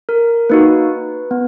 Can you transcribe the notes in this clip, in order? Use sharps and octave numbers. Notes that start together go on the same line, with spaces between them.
A#4
A#3 D#4 F#4 B4
B3